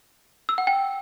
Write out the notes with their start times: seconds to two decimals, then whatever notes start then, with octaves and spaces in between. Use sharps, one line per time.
0.49 E6
0.58 F#5
0.67 G5